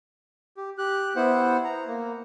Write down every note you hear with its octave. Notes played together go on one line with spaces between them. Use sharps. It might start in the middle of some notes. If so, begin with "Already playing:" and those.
G4
G4 F#6
B3 E4 C5 F#5
A#5
A#3